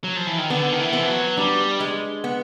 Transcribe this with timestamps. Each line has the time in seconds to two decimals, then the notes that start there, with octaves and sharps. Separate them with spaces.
0.04 F#3
0.16 F3
0.27 E3
0.38 D#3
0.50 D3 B3
0.72 D#3
0.79 E3
0.93 F3 B3
1.08 F#3
1.37 G3 D4
1.80 G#3
2.24 B3